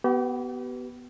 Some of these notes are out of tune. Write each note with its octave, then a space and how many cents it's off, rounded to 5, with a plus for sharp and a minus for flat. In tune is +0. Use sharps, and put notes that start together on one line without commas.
B3 +0 G4 -40